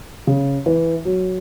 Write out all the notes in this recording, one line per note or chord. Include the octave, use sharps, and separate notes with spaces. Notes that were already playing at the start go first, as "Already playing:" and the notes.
C#3
E3
F#3